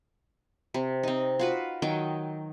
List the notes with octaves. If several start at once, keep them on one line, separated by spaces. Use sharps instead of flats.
C3
C4 D#4
F4 F#4 B4
D#3 F#3 D#4 G5